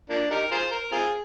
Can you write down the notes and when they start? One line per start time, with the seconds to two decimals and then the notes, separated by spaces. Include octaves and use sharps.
0.10 F3 A#3 D4
0.31 D#4 G4 A#4
0.51 F4 G#4 C5
0.71 A#4
0.92 C4 F4 G#4